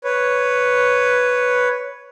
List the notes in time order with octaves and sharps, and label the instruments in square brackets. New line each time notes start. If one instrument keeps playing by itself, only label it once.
[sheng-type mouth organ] B4 C#5